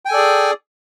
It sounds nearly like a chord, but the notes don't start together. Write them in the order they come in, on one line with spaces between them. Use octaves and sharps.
G5 G#5 A4 D5 G#4